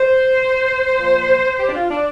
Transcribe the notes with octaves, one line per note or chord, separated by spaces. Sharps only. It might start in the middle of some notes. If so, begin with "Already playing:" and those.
Already playing: C5
A#2 F3
G4
D4
F4
D4